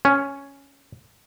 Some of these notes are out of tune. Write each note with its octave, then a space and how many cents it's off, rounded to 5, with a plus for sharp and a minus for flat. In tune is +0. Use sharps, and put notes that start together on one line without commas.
C#4 +0